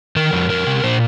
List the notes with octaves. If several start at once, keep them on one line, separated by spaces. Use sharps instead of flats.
D#3 A#4
F2
F2 A#4
C3
A#2 C5